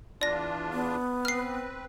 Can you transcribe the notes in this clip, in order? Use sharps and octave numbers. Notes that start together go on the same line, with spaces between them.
E2 D4 F4 D5 A#6
B3
C4 B4 F6 C7